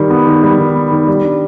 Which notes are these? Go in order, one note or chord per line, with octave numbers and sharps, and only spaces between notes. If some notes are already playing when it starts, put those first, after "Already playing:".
Already playing: D#3 G3
B3
D#3
G3
D#3
B3
D#3
G3
D4